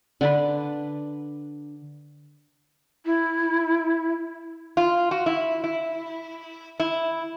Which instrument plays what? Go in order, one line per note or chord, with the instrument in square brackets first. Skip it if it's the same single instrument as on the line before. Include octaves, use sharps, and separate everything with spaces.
[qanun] D3 D4 B4
[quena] E4
[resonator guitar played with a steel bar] F4
F#4
E4
E4
E4